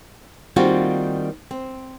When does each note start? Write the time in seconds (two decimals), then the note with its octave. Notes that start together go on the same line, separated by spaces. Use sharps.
0.56 D#3 G3 A#3 C4 F4 F#4
1.51 C4